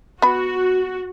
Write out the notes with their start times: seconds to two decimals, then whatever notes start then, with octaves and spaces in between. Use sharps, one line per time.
0.22 B3 F#4 B5